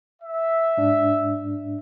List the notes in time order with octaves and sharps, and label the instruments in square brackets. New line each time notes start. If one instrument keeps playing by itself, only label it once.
[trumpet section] E5
[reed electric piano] G#2 D4